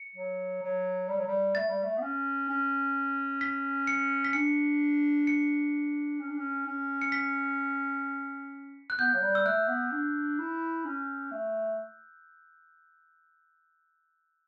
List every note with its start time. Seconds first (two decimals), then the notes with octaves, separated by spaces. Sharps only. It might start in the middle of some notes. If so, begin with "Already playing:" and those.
Already playing: C#7
0.15 F#3
0.62 F#3
1.08 G3
1.17 F#3
1.27 G3
1.55 A3 A6
1.68 G3
1.83 A3
1.98 B3
2.02 C#4
2.48 C#4
3.41 B6
3.87 C#7
4.24 B6
4.33 D4 C#7
5.27 C#7
6.20 C#4
6.28 D4
6.37 C#4
6.66 C#4
7.01 C#7
7.12 B6
8.90 F#6
8.99 B3 G6
9.14 F#3
9.22 G3
9.35 E6
9.45 A3 F#6
9.68 B3
9.91 D4
10.38 E4
10.85 C#4
11.31 A3